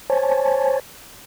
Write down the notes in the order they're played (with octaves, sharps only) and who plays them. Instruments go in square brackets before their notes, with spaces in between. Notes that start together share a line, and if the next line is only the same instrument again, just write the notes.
[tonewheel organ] C5 C#5 G#5 A5